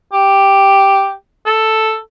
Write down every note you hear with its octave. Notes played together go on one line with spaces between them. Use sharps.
G4
A4